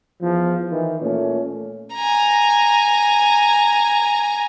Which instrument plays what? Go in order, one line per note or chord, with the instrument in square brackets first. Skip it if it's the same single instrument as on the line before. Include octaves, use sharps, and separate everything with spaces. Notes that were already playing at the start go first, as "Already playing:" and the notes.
[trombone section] E2 F3
D#3 E3
A#2 A3 C#4
[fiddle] G#5 A#5